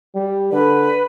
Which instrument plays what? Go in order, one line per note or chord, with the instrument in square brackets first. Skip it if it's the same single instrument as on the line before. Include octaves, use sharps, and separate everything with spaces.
[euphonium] G3
[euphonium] D3 [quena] B4